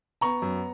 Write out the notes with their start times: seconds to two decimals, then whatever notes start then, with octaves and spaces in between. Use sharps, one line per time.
0.21 B3 A#5 C#6
0.42 F#2